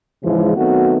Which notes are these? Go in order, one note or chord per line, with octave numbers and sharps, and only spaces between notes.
G#2 C#3 E3 F3 G#3
D#3 F#3 A3 B3 C4 F#4